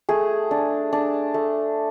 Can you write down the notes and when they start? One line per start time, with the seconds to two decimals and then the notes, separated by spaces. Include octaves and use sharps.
0.09 A3 G#4
0.51 D4
0.93 D4
1.34 A3